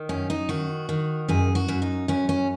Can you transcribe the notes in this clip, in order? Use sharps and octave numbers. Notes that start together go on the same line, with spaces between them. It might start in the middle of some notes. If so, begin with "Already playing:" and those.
Already playing: D#3
F#2 C#4
D#4
D#3 F#4
D#3
F#2 G#4
F#4
F#2
D#4
F#2 C#4
C#4